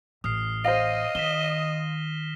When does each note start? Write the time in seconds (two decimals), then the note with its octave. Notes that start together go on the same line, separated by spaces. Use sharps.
0.24 A1 D#6 F6 C7
0.65 C5 D#5 F5 A#6 D#7
1.15 D#3 B6 E7 G7